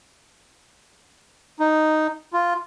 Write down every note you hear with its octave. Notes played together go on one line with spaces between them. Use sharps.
D#4
F4